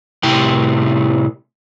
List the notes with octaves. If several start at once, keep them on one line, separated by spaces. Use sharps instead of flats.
A2 C3 E4 G4 G5